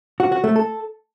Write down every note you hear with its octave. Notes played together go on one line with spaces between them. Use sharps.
F#4
F#4
A3
A4